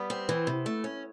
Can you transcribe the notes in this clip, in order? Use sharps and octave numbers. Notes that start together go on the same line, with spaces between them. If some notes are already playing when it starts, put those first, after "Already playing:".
Already playing: G3 B3
C4
E3
C3
A3
C#4